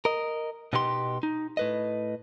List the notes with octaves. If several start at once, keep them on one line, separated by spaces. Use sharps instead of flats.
A#4 D#5
B2 B3 D#4 G4 A#4 C6
D#4
A2 B4 D#5